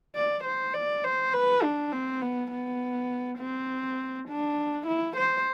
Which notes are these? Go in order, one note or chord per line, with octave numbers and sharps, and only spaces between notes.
D5
C5
D5
C5
B4
D4
C4
B3
B3
C4
D4
E4
C5